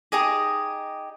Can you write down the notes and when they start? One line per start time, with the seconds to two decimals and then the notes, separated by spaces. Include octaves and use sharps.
0.12 D#4 G4 G#4 D#5